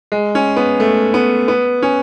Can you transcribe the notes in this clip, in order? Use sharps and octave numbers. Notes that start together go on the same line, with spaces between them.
G#3
C#4
B3
A3
B3
B3
C#4